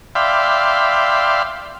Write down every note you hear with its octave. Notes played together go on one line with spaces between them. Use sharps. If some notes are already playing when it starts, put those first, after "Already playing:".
D5 E5 F5 G5 B5 C6